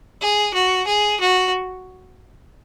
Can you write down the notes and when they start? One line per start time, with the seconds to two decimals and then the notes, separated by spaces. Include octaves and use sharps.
0.22 G#4
0.54 F#4
0.87 G#4
1.20 F#4